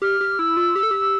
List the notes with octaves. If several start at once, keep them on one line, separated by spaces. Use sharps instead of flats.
G4 F6
G4
E4 E6
F4
G4
A4
G4